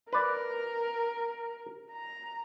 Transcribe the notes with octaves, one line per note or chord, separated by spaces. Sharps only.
A#4 B4 D5
A#5